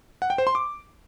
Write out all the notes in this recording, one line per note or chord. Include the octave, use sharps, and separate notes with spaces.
F#5
G5
C5
C6
D6